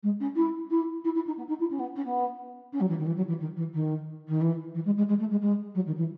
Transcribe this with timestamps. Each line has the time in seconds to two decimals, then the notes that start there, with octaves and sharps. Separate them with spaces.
0.03 G#3
0.20 C#4
0.35 E4
0.70 E4
1.04 E4
1.15 E4
1.26 D#4
1.37 B3
1.48 D#4
1.60 E4
1.70 C#4
1.79 B3
1.95 C#4
2.04 B3
2.72 C#4
2.80 F#3
2.88 E3
2.97 D#3
3.06 E3
3.16 F#3
3.27 E3
3.40 D#3
3.56 E3
3.73 D#3
4.27 D#3
4.41 E3
4.74 E3
4.85 G#3
4.96 G#3
5.08 G#3
5.19 A3
5.30 G#3
5.41 G#3
5.74 F#3
5.86 D#3
5.97 E3